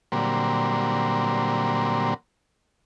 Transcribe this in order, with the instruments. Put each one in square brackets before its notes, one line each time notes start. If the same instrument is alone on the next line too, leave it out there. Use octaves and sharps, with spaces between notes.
[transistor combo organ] A#2 D3 F#3 G3 A#3 C4